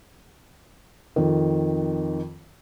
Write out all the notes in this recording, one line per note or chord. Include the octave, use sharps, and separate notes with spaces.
F2 D#3